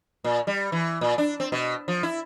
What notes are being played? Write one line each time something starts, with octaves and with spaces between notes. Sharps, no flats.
A#2
G3
E3
A#2
D4
C4
B2
F3
E4